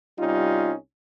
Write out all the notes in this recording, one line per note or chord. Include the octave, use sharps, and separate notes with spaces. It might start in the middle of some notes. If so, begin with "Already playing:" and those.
C2 G3 C#4 D#4 F4